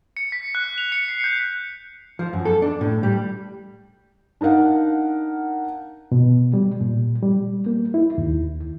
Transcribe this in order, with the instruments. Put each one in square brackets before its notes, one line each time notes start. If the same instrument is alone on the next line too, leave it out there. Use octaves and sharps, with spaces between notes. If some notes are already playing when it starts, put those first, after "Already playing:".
[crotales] C#7
B6
F#6
F7
C#7
C7
G6
[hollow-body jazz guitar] F3
F#2
A4
D4
A2
G3
[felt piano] D4 D#4 A#4 F5 F#5
[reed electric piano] B2
G3
A#2
G3
A#3
E4
D#2